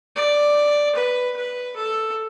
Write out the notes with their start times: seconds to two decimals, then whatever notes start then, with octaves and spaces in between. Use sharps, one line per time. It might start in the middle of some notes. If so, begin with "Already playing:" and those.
0.16 D5
0.95 B4
1.36 B4
1.76 A4